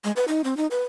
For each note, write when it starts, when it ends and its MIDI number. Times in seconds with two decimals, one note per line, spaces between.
0.04 0.12 56
0.16 0.25 71
0.28 0.41 63
0.44 0.57 60
0.57 0.67 63
0.71 0.83 71